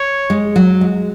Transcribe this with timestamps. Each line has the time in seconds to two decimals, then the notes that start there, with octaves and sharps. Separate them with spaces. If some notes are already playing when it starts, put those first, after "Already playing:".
Already playing: C#5
0.30 G#3
0.56 F#3
0.81 G#3